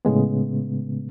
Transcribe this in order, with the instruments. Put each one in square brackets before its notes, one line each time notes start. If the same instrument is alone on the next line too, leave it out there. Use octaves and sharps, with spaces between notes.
[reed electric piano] A2 C#3 G#3 B3